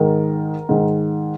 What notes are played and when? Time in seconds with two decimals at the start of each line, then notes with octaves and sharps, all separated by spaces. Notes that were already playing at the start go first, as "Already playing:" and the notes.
Already playing: G#2 D#3 A#4
0.69 G#2 D#3